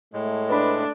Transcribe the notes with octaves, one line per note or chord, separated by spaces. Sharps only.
A2 G#3 A3
D4 B4 B5